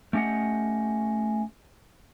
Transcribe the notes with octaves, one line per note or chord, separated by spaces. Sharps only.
A3 C#4 G4 D#5 F#5